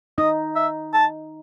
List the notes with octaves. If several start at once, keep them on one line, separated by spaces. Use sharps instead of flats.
D#4 D#5
E5
A5